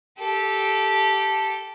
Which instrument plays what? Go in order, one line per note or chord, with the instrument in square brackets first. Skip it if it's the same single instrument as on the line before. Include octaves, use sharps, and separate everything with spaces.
[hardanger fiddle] G4 A4